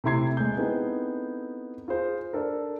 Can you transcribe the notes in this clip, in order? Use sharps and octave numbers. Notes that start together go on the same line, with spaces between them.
C3 A3 E4 C6 G#6 C7
G#3 G6
B3 C4 D#4 E4 G#4 A4
F4 G#4 C5
D4 A4 A#4